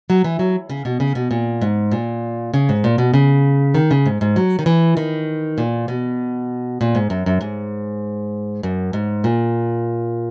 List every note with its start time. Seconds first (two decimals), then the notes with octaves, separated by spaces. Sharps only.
0.10 F#3
0.24 E3
0.39 F#3
0.70 C#3
0.85 B2
1.00 C#3
1.15 B2
1.31 A#2
1.62 G#2
1.92 A#2
2.54 C#3
2.69 G#2
2.84 A#2
2.98 B2
3.14 C#3
3.75 D#3
3.91 C#3
4.06 G#2
4.21 G#2
4.36 F#3
4.59 D#3
4.66 E3
4.97 D#3
5.58 A#2
5.88 B2
6.81 A#2
6.95 G#2
7.10 F#2
7.26 F#2
7.41 G#2
8.63 F#2
8.93 G#2
9.24 A#2